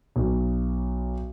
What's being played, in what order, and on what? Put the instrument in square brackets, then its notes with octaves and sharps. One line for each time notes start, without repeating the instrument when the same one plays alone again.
[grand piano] B1